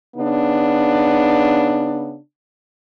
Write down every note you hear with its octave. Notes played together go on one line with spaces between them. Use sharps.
C#3 B3 D4 D#4